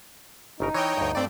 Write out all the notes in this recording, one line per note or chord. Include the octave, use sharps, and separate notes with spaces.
G1 C#3 D#4 A#4
E3 C#5 D#5 G5
D2 G2
G2 A3 C4 D5 G5